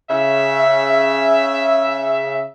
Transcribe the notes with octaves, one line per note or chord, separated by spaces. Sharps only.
C#3 E5